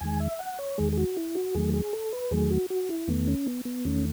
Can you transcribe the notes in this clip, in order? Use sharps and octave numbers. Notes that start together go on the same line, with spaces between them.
E2 D#3 G#3 G#5
E5
F#5
C#5
E2 D#3 G#3 G#4
G#4
F#4
E4
F#4
E2 D#3 F#3 A3 G#4
G#4
A4
B4
E2 D#3 F#3 A3 G#4
F#4
F#4
E4
E2 D#3 A3 B3
C#4
B3
B3
E2 D#3 A3 C#4